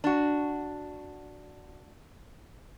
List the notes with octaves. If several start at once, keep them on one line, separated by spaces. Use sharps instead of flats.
D4 F#4